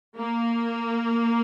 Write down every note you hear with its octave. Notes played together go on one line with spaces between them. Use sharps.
A#3